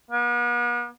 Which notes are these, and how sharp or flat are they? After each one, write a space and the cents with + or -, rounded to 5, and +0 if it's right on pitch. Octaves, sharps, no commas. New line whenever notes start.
B3 -40